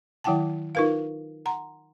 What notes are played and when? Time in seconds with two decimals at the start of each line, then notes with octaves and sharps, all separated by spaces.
0.24 D#3 F#3 E4 F#5 G5 A5
0.75 D#4 F4 A#4 B4 F5
1.46 F#5 A#5 C6